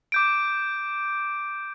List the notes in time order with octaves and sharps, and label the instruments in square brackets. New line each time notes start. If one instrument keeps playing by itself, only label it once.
[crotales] D6 G6 D7